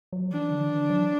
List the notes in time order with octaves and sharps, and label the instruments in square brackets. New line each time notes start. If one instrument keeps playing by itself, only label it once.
[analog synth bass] F#3
[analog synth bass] E3 [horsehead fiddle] D4
[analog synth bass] D3
E3
F#3